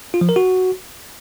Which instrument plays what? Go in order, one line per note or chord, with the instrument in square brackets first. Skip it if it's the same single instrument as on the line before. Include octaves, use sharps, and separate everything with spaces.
[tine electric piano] F4
F3
A#4
F#4